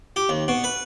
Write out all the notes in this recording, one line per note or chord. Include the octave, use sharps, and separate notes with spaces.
G4
D#2
B2
B4